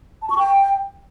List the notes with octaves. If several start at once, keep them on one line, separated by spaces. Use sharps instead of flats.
A5
C#6
G5